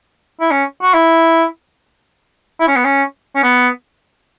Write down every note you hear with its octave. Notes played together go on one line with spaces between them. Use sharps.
E4
C#4
F#4
E4
E4
C#4
B3
C#4
C#4
B3